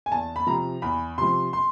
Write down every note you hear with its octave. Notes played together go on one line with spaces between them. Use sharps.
G#5
E2 A5
B5
C3 F3 A#5
E2 B5
C3 F3 C6
C6